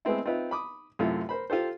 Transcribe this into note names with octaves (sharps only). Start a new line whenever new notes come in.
G#3 A3 B3 C4 E4
C4 D#4 F4 B4 E5
B5 D6 D#6
F#2 A2 C3 A3 F4
A#4 C5 B5
F4 G4 A4 C5